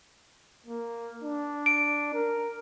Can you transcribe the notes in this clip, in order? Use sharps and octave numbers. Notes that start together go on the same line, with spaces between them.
A#3
D4
D7
A#4